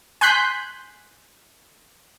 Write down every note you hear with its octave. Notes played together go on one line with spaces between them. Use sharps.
G#5 C6 F#6 G6 B6